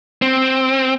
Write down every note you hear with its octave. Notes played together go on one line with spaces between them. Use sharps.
C4